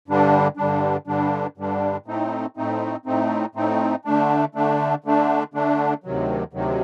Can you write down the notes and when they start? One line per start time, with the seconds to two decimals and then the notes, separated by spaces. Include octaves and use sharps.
0.08 G2 D3 G3 D4
0.57 G2 D3 G3 D4
1.07 G2 D3 G3 D4
1.57 G2 D3 G3 D4
2.06 A2 A3 C4 D#4
2.57 A2 A3 C4 D#4
3.06 A2 A3 C4 D#4
3.55 A2 A3 C4 D#4
4.05 D3 A3 D4
4.55 D3 A3 D4
5.04 D3 A3 D4
5.54 D3 A3 D4
6.04 D2 C3 D#3 F#3
6.53 D2 C3 D#3 F#3